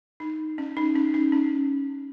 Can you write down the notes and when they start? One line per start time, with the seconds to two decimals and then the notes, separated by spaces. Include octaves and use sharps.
0.20 D#4
0.58 C#4
0.77 D#4
0.95 C#4
1.14 D#4
1.32 C#4